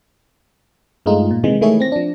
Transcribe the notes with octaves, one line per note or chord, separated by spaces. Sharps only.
G2 G#3 A3 D#4 F4
A#2
C3 D#3 E3 G#3
D#3 E3 A3 E4 G#4 C#5
C4 A#6
F3 D4